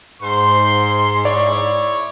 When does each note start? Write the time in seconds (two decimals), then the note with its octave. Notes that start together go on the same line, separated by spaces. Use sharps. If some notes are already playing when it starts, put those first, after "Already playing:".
0.22 G#2 C5 C6
1.25 E4 C#5 D5